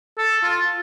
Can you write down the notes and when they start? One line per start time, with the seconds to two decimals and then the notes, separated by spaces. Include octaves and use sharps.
0.18 A4
0.43 F4